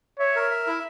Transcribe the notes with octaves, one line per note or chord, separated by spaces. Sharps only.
C#5 E5
A#4
E5
E4